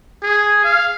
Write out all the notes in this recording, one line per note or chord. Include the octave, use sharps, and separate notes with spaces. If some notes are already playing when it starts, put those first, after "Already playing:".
G#4
F5